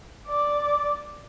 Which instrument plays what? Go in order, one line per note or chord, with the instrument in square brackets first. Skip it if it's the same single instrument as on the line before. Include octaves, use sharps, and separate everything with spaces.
[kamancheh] D5